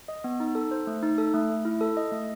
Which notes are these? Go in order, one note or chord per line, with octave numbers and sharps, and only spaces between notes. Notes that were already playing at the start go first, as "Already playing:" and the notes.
D#5
B3
D#4
A4
C5
A3
D#4
A4
A3
A3
E4
A4
D#5
A3